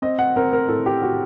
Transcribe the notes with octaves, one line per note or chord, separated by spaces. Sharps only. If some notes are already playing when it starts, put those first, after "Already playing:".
C4 D#5
F#5
C4 A#4
A#4
A2 A4
G4
A2 F#4